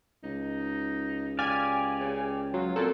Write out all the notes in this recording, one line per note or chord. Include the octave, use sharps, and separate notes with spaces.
C#2 D#4
G4 D5 F5 G#5
C#3
F#3 F4
F2 A#2 A4